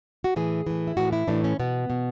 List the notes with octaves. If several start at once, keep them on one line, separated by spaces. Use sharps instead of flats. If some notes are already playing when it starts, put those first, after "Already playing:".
F#4
A2 E3 G#4
A2 E3
E4
A2 E3 F#4
E4
A2 E3 D4
C#4
B2 B3
B2